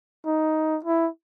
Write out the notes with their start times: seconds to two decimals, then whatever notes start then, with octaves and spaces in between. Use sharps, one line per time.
0.26 D#4
0.84 E4